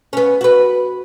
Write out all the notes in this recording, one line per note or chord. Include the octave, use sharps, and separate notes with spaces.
B3 C#4
F#4 B4